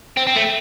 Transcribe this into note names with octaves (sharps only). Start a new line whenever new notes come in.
C4
C4
A3